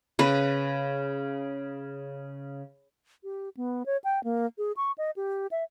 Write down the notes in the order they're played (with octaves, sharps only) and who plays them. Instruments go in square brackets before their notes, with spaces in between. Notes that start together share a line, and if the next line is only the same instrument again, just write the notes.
[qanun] C#3 B4
[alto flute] G4
B3
C#5
G5
A#3
G#4
C#6
D#5
G4
E5